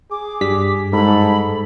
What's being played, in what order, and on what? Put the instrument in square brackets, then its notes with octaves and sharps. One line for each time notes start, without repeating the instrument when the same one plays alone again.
[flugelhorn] G#4 [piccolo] D6
[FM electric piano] G2 G3 B6
[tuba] G#2 [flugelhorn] A4 [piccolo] B5